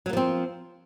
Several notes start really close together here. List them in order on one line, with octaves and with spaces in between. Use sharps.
F#3 A#3 F3 C4